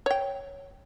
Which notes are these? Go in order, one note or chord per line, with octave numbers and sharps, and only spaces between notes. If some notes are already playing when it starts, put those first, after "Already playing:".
C#5 G5